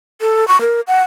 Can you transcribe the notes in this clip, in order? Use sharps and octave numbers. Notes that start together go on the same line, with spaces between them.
A4
C#6
A#4
F#5